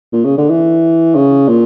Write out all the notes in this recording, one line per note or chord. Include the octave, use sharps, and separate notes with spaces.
A#2
C#3
D3
E3
C#3
A#2